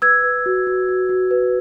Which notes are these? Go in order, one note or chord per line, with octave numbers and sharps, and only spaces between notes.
B4 E6 G#6
B4
F#4
F#4
F#4
F#4
B4